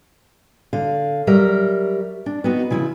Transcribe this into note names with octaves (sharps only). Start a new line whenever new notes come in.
D3 F5
F#3 G3 A#4 E5
D4
B3 C4 D#4 F#4
C#3 F3 E4